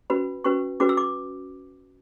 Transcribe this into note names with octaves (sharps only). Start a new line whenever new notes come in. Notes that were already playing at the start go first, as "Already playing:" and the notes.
C#4 F#4 B4 B5
C#4 F#4 B4 C#6
C#4 F#4 B4 D6
E6
D6